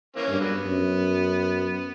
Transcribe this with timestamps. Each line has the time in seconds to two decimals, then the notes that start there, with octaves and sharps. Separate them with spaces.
0.16 E3 A#3 C#4
0.29 G2 A#3
0.40 D3 F#3 B3
0.65 F#2